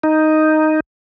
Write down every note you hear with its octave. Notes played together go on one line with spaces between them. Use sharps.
D#4